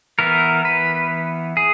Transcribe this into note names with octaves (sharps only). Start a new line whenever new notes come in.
E3 B3 A#4
B4
G#4